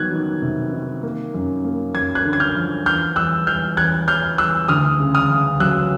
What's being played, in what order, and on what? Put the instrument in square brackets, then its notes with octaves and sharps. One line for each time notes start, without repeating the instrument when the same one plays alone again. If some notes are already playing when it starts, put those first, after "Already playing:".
Already playing: [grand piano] D#3 F#3 B3 F#6 G#6
D#3
C3
D#3
A#3
F#2
A#3
F#2 G#6
F#6 G#6
D3
G#6
F6 G6
F3
E2 F6 G6
E2 E6 F#6
E2 F6 G6
E2 F#6 G#6
E2 F6 G6
E2 E6 F#6
D2 D#6 F6
C#3
D#6 F6
C#3
F#3 E6 F#6